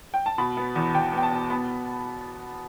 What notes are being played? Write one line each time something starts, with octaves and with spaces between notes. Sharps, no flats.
G5
A5
B2 B5
B3
E2
E2 G5
B3 G5
A5
B2
B3 B5